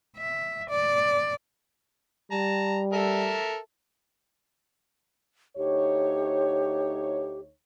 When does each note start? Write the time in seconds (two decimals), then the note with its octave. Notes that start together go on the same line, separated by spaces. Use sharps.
0.17 E5
0.69 D5
2.32 G3 A5 A#5
2.93 A4 A#4 E5
5.57 D2 D#4 G4 C#5